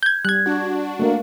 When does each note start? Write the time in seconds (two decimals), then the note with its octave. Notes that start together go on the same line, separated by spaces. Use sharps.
0.03 G6 G#6
0.25 G3 F#6 G#6
0.46 D4 F#4
0.99 A3 A#3